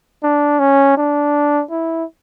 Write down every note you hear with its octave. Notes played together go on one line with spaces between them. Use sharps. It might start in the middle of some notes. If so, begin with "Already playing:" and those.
D4
C#4
D4
E4